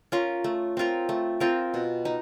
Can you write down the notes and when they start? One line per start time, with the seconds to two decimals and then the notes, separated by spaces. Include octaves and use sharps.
0.12 C#4 F4 A#4
0.44 A3
0.77 C4 F4 A#4
1.09 A3
1.40 C4 F4 A#4
1.74 B2
2.05 D#4